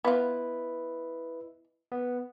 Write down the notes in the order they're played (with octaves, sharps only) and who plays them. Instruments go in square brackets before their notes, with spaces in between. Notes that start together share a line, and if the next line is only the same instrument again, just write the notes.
[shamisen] B3 F4 [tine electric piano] E4 B4 D#5
[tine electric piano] B3